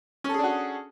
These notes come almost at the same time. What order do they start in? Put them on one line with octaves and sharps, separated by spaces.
C#4 A4 G#4 D4 F#4